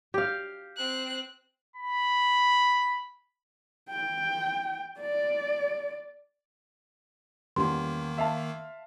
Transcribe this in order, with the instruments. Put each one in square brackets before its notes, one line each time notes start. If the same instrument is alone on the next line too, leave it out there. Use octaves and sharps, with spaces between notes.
[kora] G4 F5
[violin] C4 F#6
[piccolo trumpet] B5
[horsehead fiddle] G5
D5
[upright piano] E2 G3 C#4 [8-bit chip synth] D#3 A#3 [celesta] C6
[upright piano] E5 F5 A5